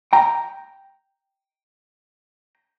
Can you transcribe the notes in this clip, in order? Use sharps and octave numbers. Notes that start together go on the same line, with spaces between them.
G5 A#5